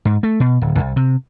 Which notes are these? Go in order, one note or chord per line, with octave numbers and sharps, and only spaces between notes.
G#2
A3
B2
D1
C2
C3